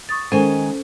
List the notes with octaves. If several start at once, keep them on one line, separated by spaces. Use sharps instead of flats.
C#6 D#6 A6
D#3 G#3 C#4 A4 C5 G#5